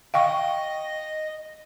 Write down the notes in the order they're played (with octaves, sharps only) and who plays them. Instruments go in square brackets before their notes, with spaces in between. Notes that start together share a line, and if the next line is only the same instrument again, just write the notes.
[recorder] D#5 [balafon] F5 G5 C#6